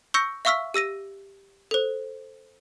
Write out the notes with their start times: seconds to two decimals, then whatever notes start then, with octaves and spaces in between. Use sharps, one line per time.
0.14 C#6 E6 G6 A#6 C#7
0.45 E5 F5 C#6 E6 F6 B6
0.74 G4 E6 A#6 D#7
1.71 A4 C5